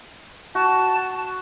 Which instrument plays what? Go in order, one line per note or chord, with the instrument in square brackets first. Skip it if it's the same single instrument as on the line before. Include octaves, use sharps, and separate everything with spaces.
[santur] F#4 [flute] A5